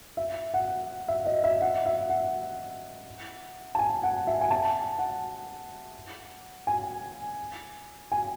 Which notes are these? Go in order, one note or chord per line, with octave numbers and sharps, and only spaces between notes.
E5
F#5
E5
D#5
E5
F#5
E5
F#5
A5
G#5
F#5
E5
G#5
A5
F#5
G#5
G#5